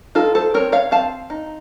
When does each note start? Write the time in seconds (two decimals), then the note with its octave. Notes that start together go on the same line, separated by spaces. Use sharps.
0.15 D#4 F4 A4
0.35 A4 C5
0.54 C4 A#4 C#5
0.72 C#5 F5
0.91 C4 F5 A5
1.30 D#4